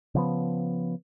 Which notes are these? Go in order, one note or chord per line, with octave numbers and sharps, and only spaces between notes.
C#3 F3 B3